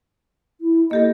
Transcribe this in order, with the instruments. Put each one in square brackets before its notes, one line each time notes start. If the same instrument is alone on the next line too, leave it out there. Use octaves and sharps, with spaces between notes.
[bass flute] E4
[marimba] A#3 G4 A4 [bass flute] D#5